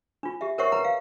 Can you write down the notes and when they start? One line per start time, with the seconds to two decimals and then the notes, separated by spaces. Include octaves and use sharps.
0.23 D4 F4
0.41 G4 E5
0.58 A#4 C5 C#5 E5 F#5 C#6
0.72 B4 F#5 A#5
0.84 F5